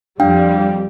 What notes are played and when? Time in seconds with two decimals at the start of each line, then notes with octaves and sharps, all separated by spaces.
0.20 F2 G3 D4 F5 G5